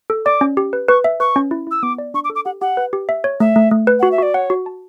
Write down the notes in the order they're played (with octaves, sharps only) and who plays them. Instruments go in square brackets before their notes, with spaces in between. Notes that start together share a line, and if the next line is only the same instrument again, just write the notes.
[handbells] A4
[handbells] D5 [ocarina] D6
[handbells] C#4
G4
B4
[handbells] B4 [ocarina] C#6
[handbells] E5
[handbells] B4 [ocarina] C#6
[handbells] C#4
E4
[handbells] E4 [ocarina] E6
[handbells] B3 [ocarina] D6
[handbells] D5
[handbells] D4 [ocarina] C#6
[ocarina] D6
[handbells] A4
[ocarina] D6
[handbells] G4 [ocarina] F#5
[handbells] G4 [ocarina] F#5
[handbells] B4
G4
E5
C#5
[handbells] A3 [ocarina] E5
[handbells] A3
A3
B4
[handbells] F#4 [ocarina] F#5
[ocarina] E5
[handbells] F#4 [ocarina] D5
[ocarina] C#5 [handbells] F#5
[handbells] F#4
A5